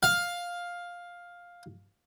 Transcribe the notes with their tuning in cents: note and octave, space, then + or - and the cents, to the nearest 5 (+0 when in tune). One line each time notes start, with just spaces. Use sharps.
F5 +10